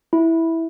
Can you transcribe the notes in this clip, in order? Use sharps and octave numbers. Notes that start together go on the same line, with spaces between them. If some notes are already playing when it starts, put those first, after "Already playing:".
E4